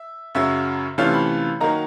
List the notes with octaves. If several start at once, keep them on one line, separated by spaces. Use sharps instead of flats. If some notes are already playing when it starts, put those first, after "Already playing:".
Already playing: E5
F#2 C#3 F#3 E5
C3 E3 A3 C#4 F4 F5
B5
D#3 F#3 A#3 D#4 A#5